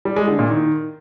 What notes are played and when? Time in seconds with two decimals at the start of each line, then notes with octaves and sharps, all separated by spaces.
0.05 G3
0.16 G#3
0.28 D3
0.39 A#2
0.50 D#3